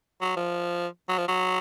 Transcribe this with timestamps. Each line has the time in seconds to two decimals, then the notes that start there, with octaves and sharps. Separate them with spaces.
0.22 F#3
0.36 F3
1.09 F#3
1.18 F3
1.28 F#3